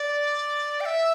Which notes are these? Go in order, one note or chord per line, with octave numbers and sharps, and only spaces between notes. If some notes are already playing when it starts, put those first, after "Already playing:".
Already playing: D5
G5
E5